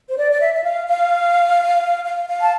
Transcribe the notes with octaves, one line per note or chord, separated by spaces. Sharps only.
C5
D5
D5
E5
E5
F5
F5
F5
F5
A5